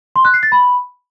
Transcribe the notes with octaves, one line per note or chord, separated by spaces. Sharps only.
C6
F#6
C7
A6
B5